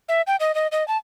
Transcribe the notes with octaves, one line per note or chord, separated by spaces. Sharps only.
E5
G5
D#5
D#5
D#5
A5